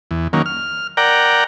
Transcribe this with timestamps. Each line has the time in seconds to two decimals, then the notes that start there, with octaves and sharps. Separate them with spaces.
0.11 E2
0.33 D#3 F#3 A#3 C#4
0.46 F6
0.97 A#4 D5 F#5 G5 A#5